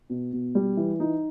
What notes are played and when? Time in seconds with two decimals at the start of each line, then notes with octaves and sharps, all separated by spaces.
0.10 B2
0.33 B2
0.55 G3
0.77 E3
1.00 D#4